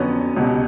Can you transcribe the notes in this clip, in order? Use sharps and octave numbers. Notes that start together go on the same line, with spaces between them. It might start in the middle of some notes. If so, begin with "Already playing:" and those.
Already playing: F2 D3 F#3 B3 C#4
C#2 B2 G3